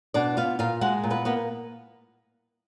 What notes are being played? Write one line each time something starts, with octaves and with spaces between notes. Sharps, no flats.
B2 D4 D5
B3 F4 F5
A#2 F4 F5
G#3 F#4 F#5
A#2
B3 B4
A#3 B3 B4